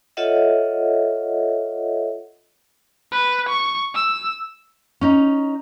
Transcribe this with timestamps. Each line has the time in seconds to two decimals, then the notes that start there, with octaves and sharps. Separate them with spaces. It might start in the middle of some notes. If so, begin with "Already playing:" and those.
0.17 F4 A4 C#5 D#5 E5 F#5
3.12 B4
3.49 C#6
3.95 E6
5.01 C#4 D#4